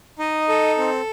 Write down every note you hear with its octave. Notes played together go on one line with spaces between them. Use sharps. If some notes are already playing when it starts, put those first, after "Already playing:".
D#4 D#5
A4
C4